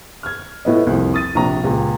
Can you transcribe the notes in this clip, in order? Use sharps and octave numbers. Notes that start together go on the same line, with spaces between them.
F6 G#6
A2 B3 D#5
C2 F2
D#6 A6 D#7
A#1 C3 A#5
C#2 A#2